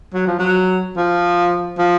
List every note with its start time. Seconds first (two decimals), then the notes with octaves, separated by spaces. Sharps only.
0.14 F#3
0.27 F3
0.39 F#3
0.97 F3
1.78 F3